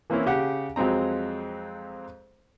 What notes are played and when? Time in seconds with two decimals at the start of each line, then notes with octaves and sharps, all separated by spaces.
0.10 E3 A#3 C4 C#4 E4
0.26 C#3 G4 F#5
0.76 F2 F#3 G#3 C4 A#5